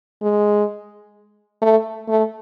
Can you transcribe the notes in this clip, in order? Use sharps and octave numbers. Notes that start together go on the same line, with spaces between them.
G#3
A3
A3